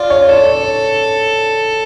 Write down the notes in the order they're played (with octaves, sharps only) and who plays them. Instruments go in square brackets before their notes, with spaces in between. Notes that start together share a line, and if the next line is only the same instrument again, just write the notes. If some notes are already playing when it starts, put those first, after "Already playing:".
Already playing: [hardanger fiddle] F4 [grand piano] D5
[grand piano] C#5
[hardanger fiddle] A4 [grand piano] D5
[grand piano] C#5